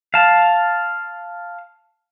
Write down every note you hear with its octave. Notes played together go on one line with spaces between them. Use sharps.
F5 A5